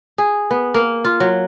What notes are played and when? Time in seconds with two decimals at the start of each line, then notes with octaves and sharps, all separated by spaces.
0.18 G#4
0.51 B3
0.74 A#3
1.05 F4
1.20 F#3